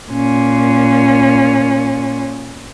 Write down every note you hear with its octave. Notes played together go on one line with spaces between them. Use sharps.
A#2 C#4